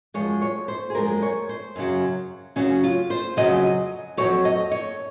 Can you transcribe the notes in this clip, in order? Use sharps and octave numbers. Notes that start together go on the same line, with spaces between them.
F#2 F3 G#3 C#5
C#5
C5
G#4
F#2 F3 G#3 A#4
C#5
C5
F#2 C#3 F#3
F#2 C#3 F#3 C#4
F4
C5
F2 C#3 F#3 D#5
F2 C#3 F#3 C#5
D#5
C#5